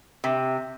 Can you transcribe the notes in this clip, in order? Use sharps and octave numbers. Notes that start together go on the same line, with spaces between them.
C3